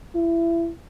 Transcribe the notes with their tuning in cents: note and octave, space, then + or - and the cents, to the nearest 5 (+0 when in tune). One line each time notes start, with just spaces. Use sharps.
E4 +25